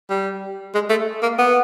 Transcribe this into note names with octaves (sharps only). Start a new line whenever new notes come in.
G3
G#3
A3
A#3
B3